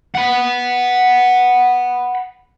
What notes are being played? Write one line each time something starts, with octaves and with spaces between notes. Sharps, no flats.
F#5 B5